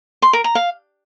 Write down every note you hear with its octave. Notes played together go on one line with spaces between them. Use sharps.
C6
A#4
A#5
F5